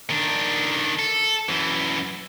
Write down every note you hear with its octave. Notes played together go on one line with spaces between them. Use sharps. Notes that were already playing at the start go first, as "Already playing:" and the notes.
D#3 D4
A4
F#2 E3